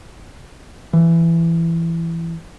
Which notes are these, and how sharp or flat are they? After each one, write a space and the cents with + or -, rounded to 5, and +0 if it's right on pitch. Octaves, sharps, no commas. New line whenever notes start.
E3 +15